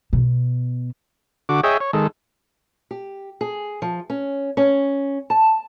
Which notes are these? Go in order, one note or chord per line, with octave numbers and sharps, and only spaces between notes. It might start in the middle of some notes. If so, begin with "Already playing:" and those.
B2
D3 F#4 D6
G#4 C#5 D#5 E5 G5
C#5
D#3 G#3 A4
G4
G#4
F3
C#4
C#4
A5